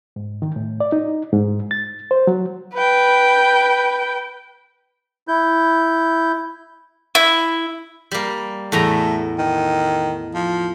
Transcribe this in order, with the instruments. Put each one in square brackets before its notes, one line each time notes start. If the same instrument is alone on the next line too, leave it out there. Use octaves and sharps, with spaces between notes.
[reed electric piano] G#2
D#3
A2
D5
D#4
G#2
A6
C5
F#3
[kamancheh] B4 G5
[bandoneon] E4 G6
[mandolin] E4
[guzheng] G3 A#3
[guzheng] E2 A2 A#5 [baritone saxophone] A3
[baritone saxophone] D#3
F3